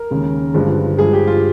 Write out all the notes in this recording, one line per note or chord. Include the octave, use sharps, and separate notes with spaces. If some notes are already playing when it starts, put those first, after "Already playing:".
Already playing: A#4
D#2 C#3 G#3
G1 G2 F3 G#3
G2 F3 G#3 G#4
G4
F4